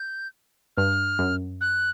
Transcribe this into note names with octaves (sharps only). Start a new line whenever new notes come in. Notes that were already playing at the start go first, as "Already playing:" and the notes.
Already playing: G6
G2 F6
F#2
F#6